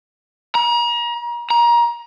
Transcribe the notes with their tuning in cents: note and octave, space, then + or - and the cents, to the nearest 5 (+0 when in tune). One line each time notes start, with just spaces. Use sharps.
A#5 +35
A#5 +25